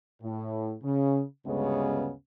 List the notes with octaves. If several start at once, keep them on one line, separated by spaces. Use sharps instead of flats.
A2
C#3
D2 G2 C#3 G#3 B3 C#4